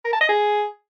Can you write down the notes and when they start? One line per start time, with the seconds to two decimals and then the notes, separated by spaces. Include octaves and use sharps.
0.05 A#4
0.13 A5
0.21 D#5
0.29 G#4